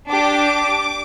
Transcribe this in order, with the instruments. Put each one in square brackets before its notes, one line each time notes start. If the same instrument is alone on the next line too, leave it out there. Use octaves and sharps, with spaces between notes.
[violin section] D4 G4 D6